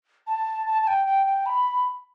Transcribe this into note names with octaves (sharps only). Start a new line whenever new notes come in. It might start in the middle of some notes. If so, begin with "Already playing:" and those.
A5
A5
A5
G5
G5
G5
B5